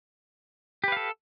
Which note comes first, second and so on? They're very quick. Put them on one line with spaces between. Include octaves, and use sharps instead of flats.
G4 B4 F5 A4